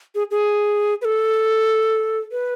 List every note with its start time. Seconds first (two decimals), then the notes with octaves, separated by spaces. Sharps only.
0.15 G#4
0.31 G#4
1.01 B4
1.05 A4
2.32 B4